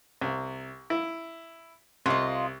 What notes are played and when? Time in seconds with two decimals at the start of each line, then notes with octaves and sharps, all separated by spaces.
0.21 C2
0.90 E4
2.06 C2 F4 D#5